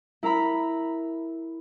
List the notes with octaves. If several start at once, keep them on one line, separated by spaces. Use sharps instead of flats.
E4 A#4 A#5 B5